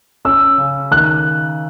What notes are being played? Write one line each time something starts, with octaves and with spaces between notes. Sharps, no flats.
C#4 E6
C#3
D#3 F#6